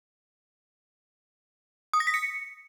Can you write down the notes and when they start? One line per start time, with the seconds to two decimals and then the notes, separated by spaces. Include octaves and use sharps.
1.93 D#6
2.00 A#6
2.07 B6
2.14 C#7